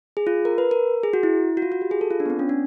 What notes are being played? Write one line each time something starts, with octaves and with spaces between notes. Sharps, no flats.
G#4
F4
A#4
B4
A#4
G#4
F#4
E4
F#4
F4
F#4
G4
G#4
A4
F4
D4
B3
C4
C#4
D4